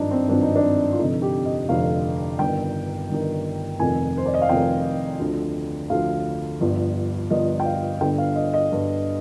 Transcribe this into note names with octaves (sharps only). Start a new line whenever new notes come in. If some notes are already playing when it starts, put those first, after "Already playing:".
Already playing: G#1 G2 F3 D4 D#4
C4
G#1 G2 F3 D4
D#4
D4
F4
F1 F2 D3 D#4
G4
D#5
F1 F2 D3 F5
G1 G2 D#3 G5
G1 G2 D#3
F1 F2 D#3 G#5
C5
D5
D#5
F5
F1 F2 D#3 G5
D2 D3 F3
D2 D3 F3 F5
G1 G2 F3
G1 G2 F3 D#5
G5
F5
G1 G2 D3 G5
F5
D#5
D#5
G1 G2 D3